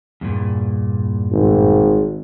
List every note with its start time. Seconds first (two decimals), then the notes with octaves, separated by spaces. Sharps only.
0.21 E2 G2 A#2
1.32 G#1